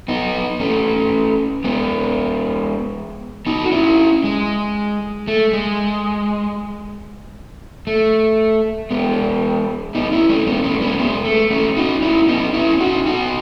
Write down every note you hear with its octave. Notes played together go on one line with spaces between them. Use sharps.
B3 D#4
A3 C#4
G#3 B3
B3 D#4
F#4
C#4 E4
G#3
A3
G#3
A3
G#3 B3
B3 D#4
C#4 E4
A3 C#4
G#3 B3
A3 C#4
G#3 B3
G#3 B3
A3
A3 C#4
D#4 F#4
C#4 E4
B3 D#4
C#4 E4
D#4 F#4
D#4 F#4